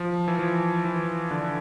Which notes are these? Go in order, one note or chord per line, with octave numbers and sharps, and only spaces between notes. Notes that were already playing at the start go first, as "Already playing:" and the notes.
Already playing: F3
E3
F3
E3
D3